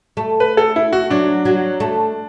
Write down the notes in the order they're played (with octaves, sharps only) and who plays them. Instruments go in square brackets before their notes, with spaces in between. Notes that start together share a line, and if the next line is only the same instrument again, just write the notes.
[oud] A3
[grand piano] B4
A4
E4
F#4
[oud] F#3 [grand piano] D4
[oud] F#3
A3